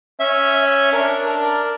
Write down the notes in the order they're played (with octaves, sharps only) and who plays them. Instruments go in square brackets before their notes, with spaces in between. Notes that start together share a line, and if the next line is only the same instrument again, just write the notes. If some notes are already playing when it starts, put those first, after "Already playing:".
[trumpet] C#4 [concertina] E5
[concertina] E5
[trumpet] D4 [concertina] A#4
[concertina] A#4